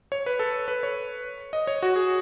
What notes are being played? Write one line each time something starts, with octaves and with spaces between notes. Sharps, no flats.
C#5
B4
A4
B4
C#5
D#5
C#5
F#4
G#4